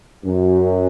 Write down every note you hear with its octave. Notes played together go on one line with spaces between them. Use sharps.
F#2